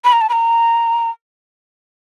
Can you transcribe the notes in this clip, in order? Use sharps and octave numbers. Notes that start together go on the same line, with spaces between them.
B5
A#5
A5
B5
A#5